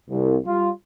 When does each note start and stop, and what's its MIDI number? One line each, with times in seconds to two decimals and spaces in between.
0.10 0.36 36
0.46 0.70 55
0.46 0.70 65